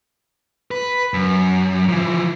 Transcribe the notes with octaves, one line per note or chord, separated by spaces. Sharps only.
B4
F#2
E3 F3